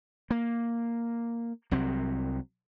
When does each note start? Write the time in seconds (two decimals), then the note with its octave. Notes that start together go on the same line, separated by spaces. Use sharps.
0.31 A#3
1.71 C2 F#3 C4